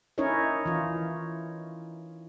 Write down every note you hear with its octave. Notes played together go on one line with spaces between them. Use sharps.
C#4 D#4 E4 A#4 C#5 D#5
E3 F4